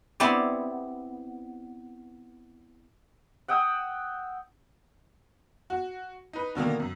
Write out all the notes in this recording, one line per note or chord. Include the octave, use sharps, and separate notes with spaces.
B3 C4 E4 G4 D5
F#5 G5 D#6 E6
F#4
D#4 B4
B2 D3 D#3 A#3
F#2